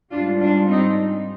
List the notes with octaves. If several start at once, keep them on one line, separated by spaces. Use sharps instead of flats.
G#2 G3 D4 F4
D4 F4
C4 D#4